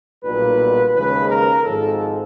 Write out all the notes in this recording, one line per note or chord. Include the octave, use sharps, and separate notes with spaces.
B1 A#2 G3 B4
D#2 C#3 F3 G#3 B4
A#4
G#1 G#2 F3 A4